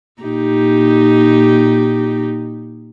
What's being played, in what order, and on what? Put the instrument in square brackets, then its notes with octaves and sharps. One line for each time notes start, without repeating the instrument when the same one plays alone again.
[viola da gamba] A#2 D#4 G4